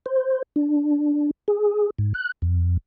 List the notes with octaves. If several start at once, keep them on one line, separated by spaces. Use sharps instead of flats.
C5
D4
G#4
G#2
F#6
F2